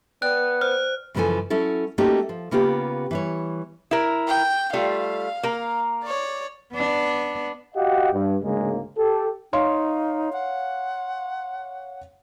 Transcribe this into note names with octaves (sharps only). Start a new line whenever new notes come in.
B3 D5 G5 F#6
C5 F6
F#2 C#3 E3 F3 A4 G#5
F#3 C#4 E4 A4
A3 A#3 C#4 D#4 F#4 G4
F3
C#3 A#3 B3 F4 G4
E3 G3 C#5
E4 A#4
G5
G3 A3 F4 F5
A#3 A#4
C#5 D5
B3 D4
F#4 G4 D#5 F5 F#5
G2
D2 G#2 C#3 G#3 A#3
G4 A4
D#4 C#5 F5 C6
F#5